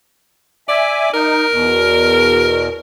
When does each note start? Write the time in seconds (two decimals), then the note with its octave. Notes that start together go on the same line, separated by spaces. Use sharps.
0.69 D5 E5 G#5
1.14 D#4 A#4
1.52 E2 B2